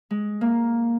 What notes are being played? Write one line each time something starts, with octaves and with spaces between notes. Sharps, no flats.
G#3
A#3